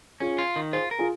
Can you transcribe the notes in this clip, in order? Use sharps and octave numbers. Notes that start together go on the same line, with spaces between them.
C#4 F4 G#4
F4
D#3
F4 G#4 C5
A#4
F4 G#4